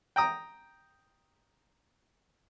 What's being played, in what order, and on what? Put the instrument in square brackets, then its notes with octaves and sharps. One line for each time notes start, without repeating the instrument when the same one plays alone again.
[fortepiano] G5 A#5 D#6